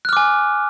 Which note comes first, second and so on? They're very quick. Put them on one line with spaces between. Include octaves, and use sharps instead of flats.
F#6 F6 D6 G#5